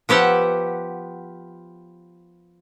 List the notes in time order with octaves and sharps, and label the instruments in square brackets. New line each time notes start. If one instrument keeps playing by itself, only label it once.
[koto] F3 B3 G4 E5 F#5